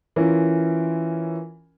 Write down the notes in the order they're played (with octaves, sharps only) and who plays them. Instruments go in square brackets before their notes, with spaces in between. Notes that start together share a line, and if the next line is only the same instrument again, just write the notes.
[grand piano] E3 C#4 E4 F4 A#4